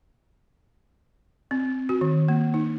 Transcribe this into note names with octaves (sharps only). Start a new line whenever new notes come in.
C4
F#4
D#3
A#3
D#4